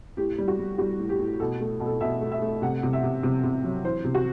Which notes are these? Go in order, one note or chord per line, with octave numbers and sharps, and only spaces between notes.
A2 G4
G3
F#4
G3
G3 F#4
A2
G4
A2
B2 A4
A3
B2
A4
B2 E5
A3
E5
A3
C3 F#5
C3
E5
C3
C3
C3
F#3
E3 C5
C3
F#4